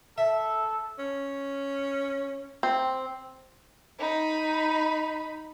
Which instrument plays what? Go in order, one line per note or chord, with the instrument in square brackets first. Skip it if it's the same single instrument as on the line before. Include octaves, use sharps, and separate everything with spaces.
[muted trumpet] A4 [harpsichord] E5
[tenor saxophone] C#4
[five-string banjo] C4
[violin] D#4 B5